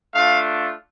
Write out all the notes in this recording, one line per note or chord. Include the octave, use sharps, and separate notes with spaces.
A3 D4 F4 F5